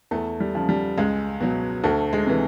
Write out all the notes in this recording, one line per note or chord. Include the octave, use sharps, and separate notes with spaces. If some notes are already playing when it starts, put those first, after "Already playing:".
E2 A3
G3
C#3 F3
G3
C#2 G#3
B2 F#3
D2 A3
G#3
C3 E3